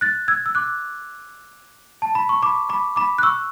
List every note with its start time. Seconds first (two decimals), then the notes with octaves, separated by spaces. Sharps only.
0.01 F#6 A6
0.28 E6 G#6
0.46 E6
0.55 D6 F#6
2.02 A5
2.15 B5
2.29 C#6
2.42 B5 D6
2.69 B5 D6
2.96 B5 D6
3.18 F#6
3.23 C#6 E6